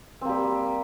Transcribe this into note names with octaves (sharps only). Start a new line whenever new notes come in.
G3 A#3 C4